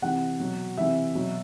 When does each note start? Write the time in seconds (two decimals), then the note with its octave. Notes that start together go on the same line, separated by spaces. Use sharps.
0.02 C3 E3 F#5
0.39 B2 F#3
0.77 C3 E3 E5
1.15 B2 F#3